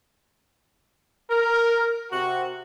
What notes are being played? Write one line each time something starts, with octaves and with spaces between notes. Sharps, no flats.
A#4
C3 F#4